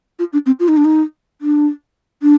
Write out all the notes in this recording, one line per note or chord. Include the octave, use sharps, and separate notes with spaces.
F4
D4
C4
F4
D#4
D4
D#4
D4
D4